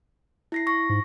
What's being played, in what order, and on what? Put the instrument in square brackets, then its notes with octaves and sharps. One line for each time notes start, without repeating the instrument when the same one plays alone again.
[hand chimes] E4 A#6 C7
C#6 A#6
[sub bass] G#2